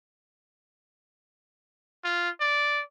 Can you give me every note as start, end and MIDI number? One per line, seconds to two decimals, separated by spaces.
2.04 2.30 65
2.40 2.82 74